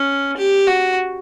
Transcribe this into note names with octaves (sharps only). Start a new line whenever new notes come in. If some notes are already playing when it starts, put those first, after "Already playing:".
Already playing: C#4
G4
F#4